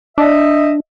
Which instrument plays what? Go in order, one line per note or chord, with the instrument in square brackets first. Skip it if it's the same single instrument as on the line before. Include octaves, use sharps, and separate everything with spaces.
[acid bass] D4 [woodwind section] D#5 E5